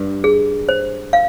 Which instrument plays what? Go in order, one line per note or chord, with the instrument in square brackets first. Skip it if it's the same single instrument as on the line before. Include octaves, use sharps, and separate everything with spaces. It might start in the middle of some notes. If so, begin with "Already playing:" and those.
Already playing: [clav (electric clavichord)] G2
[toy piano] G#4
C5
F5